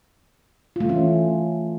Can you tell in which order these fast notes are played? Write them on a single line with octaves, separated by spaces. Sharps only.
F4 A3 E3 C#4